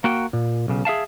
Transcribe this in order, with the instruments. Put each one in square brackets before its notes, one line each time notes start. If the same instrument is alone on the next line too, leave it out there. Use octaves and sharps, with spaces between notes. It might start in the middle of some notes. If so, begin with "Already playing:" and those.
[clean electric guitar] A#3 F#4 G5
A#2
B1 C#3
G#4 E5 F5 A5